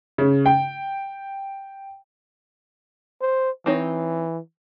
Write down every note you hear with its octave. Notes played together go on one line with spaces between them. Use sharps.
C#3
G5
C5
E3 C4 D#4 C#5